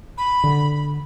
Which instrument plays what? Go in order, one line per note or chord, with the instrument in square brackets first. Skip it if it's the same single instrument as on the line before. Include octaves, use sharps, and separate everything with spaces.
[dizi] B5
[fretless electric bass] D3